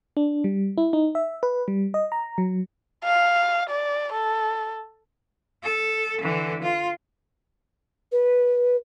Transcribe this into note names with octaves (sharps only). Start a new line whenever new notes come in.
D4
G3
E4
D#4
E5
B4
G3
D#5
A#5
F#3
F5
D5
A4
A4
D3 E3
F4
B4